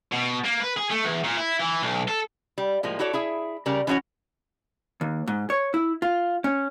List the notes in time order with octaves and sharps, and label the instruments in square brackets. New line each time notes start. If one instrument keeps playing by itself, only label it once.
[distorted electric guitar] B2
A#3
B4
G#4
A3
E2
A#2
E4
E3
B1
A4
[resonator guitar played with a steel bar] G3
A2 F3 G#3 A#3
E4 F#4 A4 C#5 D5
E4 G#4 E5
C#3 G3 A#4 D5
E3 C#4 D4 F#4 C#5
[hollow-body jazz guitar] D#2
G#2
C#5
E4
F4
C#4